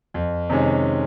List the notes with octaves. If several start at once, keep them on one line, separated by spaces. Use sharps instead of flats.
F2
C3 D#3 G#3 C#4